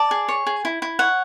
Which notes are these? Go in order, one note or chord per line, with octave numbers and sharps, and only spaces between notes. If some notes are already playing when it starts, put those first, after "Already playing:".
Already playing: D5 A5
G#4
C#5
G#4
E4
E4
C#5 F#5